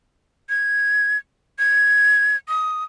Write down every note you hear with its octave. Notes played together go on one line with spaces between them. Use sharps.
G#6
G#6
D#6